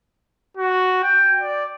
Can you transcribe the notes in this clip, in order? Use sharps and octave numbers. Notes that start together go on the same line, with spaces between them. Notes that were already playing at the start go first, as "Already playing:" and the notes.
F#4
G5
D5